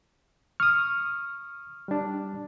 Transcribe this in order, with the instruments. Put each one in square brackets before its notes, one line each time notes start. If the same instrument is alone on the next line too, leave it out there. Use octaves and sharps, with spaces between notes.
[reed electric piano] C#6 D#6 [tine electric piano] F6
[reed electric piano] G3 D4